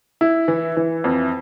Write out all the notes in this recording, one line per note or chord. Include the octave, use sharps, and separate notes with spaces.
E4
E3
E3
F2